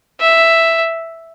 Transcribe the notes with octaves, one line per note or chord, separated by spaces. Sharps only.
E5